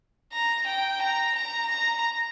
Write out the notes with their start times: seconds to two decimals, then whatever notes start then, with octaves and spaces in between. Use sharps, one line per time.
0.33 A#5
0.67 G5
1.02 A#5
1.36 A#5
1.71 A#5